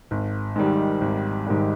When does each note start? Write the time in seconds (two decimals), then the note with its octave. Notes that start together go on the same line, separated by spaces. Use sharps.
0.11 G#1
0.56 G#2 D#3 G3
1.01 G#1
1.46 G#2 D#3 G3